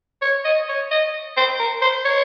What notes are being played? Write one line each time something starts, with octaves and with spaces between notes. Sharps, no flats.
C#5
D#5
C#5
D#5
C5
A#4
C5
C#5